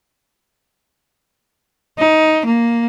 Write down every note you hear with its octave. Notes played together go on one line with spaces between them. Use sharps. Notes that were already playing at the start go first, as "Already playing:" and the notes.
D#4
A#3